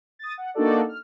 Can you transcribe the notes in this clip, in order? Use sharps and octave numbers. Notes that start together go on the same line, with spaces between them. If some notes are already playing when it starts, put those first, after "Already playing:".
D#6 A6
F#5
A#3 D4 D#4 F#4 A4 D5
F6